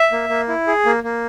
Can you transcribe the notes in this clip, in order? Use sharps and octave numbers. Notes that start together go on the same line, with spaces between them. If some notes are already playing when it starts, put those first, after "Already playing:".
Already playing: E5
A#3
A#3
E4
G#4
A#3
A#3